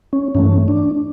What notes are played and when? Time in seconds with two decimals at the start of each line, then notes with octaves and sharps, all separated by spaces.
0.13 C#4
0.35 G2 E3 A3 C#4
0.68 D4